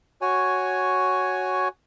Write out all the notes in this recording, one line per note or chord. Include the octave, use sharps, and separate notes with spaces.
F#4 C#5 G#5